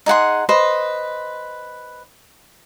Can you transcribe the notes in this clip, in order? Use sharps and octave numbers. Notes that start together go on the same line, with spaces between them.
D#4 G#4 F#5 C6
B4 C5 D#5